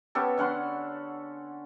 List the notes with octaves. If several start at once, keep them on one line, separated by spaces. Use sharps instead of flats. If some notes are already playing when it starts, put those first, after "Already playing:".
B3 C#4 G4 A4
D3 C#4 F#5 C6